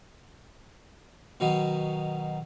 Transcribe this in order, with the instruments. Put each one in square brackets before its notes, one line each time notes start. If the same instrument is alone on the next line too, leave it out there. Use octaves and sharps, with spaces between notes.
[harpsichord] B2 D#3 F#3